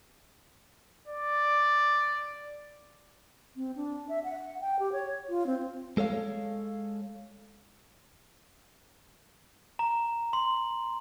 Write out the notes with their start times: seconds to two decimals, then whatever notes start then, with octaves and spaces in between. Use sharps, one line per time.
1.07 D5
3.56 C4
3.76 D4
4.09 E5
4.24 F#5
4.61 G5
4.79 G4
4.92 C#5
5.29 F4
5.46 C4
5.97 G#3 A4 C#5 F5
9.79 A#5
10.33 C6